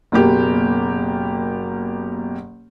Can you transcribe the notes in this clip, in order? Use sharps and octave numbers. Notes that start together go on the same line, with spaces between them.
F#1 B2 A#3 G4